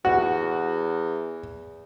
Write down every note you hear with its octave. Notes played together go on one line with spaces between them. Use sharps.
E2 F#4